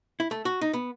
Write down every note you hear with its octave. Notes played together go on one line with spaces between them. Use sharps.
E4
A3
F#4
D#4
B3